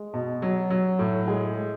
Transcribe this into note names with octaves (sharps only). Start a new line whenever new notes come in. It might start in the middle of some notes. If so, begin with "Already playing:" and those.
Already playing: G#3
B2
F#3
F#3
A2
G#3 G#4
G#3